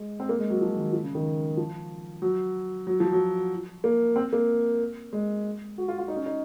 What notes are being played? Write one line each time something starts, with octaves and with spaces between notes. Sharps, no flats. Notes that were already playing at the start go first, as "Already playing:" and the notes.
Already playing: G#3
C4
A#3
G#3
F#3
F3
D#3
F3
C#3
D#3
F3
F#3
F#3
F3
F#3
A#3
C4
A#3
G#3
F#4
F4
F4
D#4
C#4
D#4